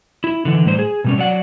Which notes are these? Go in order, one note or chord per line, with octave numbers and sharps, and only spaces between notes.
E4
D3 E3
A2 G3 C5
G#4
B2 G3 C#4
F#3 D5 F#5